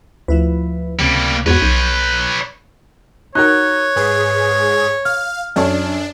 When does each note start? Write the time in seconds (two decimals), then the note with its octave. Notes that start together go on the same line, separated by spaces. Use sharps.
0.28 D2 F3 E4 B4
0.99 C#2 C3 G3 A#3
1.46 E2 G#2 B3 F#4 B4 C#5
1.62 B1 G6
3.35 D#4 F#4 A#4 C#5 F#6
3.96 G#2 G#4 B4
5.05 F5 F6
5.56 F#2 D4 A4 C#5